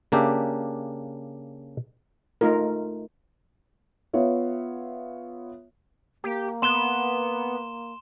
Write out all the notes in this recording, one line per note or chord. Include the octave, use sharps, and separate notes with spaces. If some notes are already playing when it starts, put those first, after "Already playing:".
C#3 A#3 D4 G4 E5
A3 D#4 F4 A#4
B3 F4 C#5 E5
A#3 G4
B3 C6 E7 G7